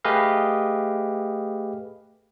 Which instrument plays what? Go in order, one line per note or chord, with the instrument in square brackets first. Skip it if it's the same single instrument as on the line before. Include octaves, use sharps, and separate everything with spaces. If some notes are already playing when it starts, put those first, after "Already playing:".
[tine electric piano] A3 G4 G#4 B4 D#5 F5